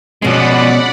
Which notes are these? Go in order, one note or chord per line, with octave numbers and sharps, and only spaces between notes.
B2 F3 G#3 C#4 D5 F#5 B5